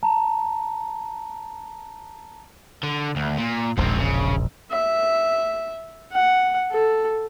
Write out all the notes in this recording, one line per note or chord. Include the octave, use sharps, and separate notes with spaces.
A5 A#5
D3
D2
A#2
E1 A#1 G#2 C4
C#3
E5
F#5
A4